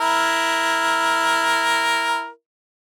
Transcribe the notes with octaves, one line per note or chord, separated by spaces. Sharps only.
E4 A#4